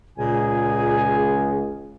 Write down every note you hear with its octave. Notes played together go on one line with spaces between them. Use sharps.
C#2 A#2 G#4 G#5